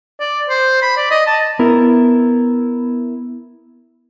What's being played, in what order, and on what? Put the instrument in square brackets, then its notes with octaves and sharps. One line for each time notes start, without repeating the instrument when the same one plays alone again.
[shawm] D5
C5
B5
D5
D#5
A5
[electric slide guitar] B3 E4 A#4